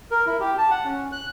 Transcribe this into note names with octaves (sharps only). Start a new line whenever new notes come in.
A#4
E4
G4
A5
F#5
C#4
F#6